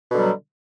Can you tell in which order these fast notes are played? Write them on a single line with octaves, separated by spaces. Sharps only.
B2 D3 G3 F#3